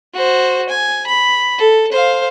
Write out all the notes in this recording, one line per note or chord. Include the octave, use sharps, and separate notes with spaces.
F#4 C5
G#5
B5
A4
C5 F5